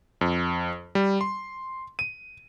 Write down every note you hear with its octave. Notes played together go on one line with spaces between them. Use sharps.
F2
G3
C6
D#7